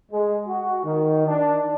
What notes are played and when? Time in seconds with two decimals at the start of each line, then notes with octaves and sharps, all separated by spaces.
0.12 G#3
0.47 F#4
0.84 D#3
1.27 D4